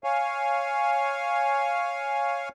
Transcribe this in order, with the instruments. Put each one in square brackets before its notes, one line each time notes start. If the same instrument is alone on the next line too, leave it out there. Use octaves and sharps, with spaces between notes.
[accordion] C#5 F5 G#5